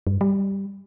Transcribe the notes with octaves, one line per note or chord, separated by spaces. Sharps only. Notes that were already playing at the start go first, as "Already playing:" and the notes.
G2
G3